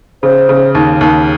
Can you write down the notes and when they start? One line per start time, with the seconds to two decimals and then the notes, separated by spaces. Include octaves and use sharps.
0.23 C#3 C5
0.49 C#3
0.75 D#2
1.01 D#2